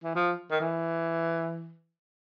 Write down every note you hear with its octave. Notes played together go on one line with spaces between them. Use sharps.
E3
F3
D#3
E3